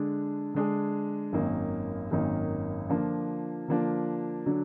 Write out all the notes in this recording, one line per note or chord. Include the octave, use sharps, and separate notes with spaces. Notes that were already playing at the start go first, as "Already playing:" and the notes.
Already playing: D3 G#3 D4 G#4
D3 G#3 D4 G#4
G#1 F#2 D#3 A#3 D#4
G#1 F#2 D#3 A#3 D#4
D3 F3 A#3 D4 F4
D3 F3 A#3 D4 F4
D3 F#3 D4